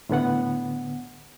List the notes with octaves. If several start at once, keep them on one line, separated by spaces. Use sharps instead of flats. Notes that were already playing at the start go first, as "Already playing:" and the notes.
A2 D3 B3 F#5